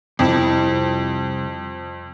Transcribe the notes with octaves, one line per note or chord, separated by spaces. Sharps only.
C2 F2 E4